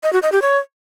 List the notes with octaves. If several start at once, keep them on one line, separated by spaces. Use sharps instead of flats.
D#5
F#4
D#5
G4
C#5